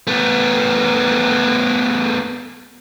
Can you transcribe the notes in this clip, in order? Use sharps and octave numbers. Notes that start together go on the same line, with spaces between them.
A3 B3